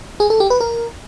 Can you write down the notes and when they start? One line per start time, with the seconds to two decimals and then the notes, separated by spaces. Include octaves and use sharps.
0.20 G#4
0.30 A4
0.40 G4
0.50 B4
0.61 A#4